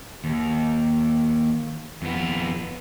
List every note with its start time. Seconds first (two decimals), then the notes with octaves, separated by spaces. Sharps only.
0.24 D#2
2.02 F2 B3